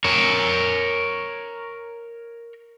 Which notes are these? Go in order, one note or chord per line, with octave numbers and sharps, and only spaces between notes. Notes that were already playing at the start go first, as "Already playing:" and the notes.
A#4 C#5